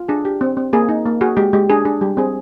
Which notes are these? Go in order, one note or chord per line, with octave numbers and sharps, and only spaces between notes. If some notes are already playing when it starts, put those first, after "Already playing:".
Already playing: F4
D4 G#4
G4
C4
C4
A#3 G#4
D#4
A#3
F#4 G#4
G#3 G4
G#3 G4
D4 G#4
D4 G#4
G3 G4
C4 G#4